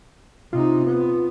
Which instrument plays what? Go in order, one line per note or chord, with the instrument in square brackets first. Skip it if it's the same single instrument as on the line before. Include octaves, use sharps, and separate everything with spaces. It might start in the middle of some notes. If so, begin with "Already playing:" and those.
[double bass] C3 D#4 [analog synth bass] F4
[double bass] B3